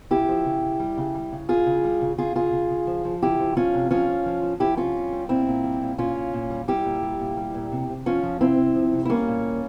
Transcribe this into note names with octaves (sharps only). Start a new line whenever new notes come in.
C#3 E4 G4
F3
C#3
C#3
G3
C#3
G3
C#3
E3 F4 G#4
C#3
G3
C#3
C#3 F4 G#4
C#3 F4 G#4
C#3
C#3
F3
F3
C#3 E4 G4
F3
F3 C#4 F4
C3
F3 C#4 F4
F3
F3
F3
F3 E4 G4
C3 C#4 F4
G3
G3
A#2 C4 E4
A#2
G3
A#2
A#2 C#4 F4
A#2
A#2
G3
G3 E4 G4
A#2
G3
A#2
G3
A#2
C3
C3
F3 C#4 F4
F3
C3 C4 E4
C3
F3
C3
E4
G3 A#3 C#4
A#2
G3